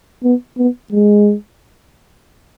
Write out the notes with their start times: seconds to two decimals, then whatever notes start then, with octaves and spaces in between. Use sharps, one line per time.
0.23 B3
0.57 B3
0.92 G#3